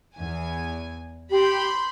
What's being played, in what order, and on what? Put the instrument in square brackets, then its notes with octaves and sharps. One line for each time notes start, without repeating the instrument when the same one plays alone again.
[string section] E2 G#5
[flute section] G4 [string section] B5 C6 G6